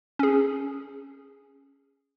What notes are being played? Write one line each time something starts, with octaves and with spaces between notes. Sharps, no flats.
C#4 G#4